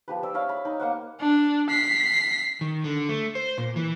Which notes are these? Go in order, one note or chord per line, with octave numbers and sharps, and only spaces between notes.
F3 G4 B4
C5 D5 E6
C#5 E5 F5 B5
B5
D#4
A#3 C5 F#5
D4
B6 C7
D#3
D3
A3
C5
A#2
E3